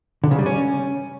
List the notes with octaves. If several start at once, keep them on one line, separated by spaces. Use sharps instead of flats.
D3
C#3
G3
C#4